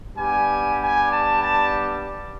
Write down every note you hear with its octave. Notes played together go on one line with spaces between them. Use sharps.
G3 B3 D4 G4 G#5
G#5
A5
A5